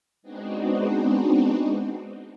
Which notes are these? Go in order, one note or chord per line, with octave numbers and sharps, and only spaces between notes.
G#3 B3 C4 D4 D#4 F#4